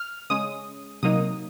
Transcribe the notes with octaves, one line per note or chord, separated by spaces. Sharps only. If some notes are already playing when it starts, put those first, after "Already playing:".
Already playing: F6
C#3 G#3 C#4 D#6
C3 F#3 A#3 D#4 D#6